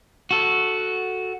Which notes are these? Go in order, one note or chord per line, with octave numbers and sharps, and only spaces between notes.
F#4 A4